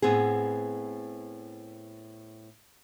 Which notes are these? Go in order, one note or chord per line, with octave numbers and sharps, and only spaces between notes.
A2 B3 C4 G#4